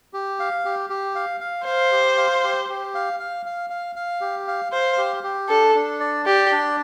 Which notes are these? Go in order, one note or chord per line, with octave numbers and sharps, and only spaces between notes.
G4
F5
G4
G4
F5
F5
C5 F5
G4
F5
G4
G4
F5
F5
F5
F5
F5
G4
F5
C5 F5
G4
G4
D4 A4
D4
D5
G4 D5
D4